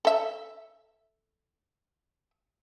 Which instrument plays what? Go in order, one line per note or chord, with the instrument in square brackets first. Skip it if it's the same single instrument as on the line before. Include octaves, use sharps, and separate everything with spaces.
[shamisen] A4 E5